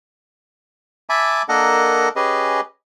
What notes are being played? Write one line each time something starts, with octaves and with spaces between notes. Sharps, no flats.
E5 G#5 A5 B5 D6
A#3 D4 A4 A#4 D#5 F#5
C#4 G4 G#4 B4 D#5